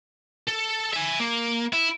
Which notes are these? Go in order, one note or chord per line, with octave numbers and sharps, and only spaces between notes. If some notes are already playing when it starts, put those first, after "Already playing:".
A4
E5 G#5
A#3
E4